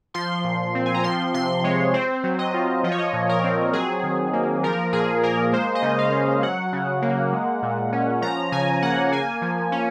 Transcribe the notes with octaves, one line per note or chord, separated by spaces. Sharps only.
F3 C6
A#2
C4
G#5
A#5
F3 C6
C3 C6
G#3 C#5
C4 C5
F#3
D#5
F4
F3 D#5
C#5
D#5
A#2
A#4
C4
F#3 G#4
D#3
A#3
F3 A#4
A#2 G#4
A#3 A#4
G#3 C5
D#5
C#3
F5
C#4
F#3 F#5
C#3
A#3
G#3
A#2
C#4
F3 A#5
C#3 G#5
A#3 F#5
A#3 G#5
F3
C#4